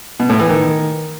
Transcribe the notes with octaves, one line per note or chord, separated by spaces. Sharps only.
B2
A2
E3
D#3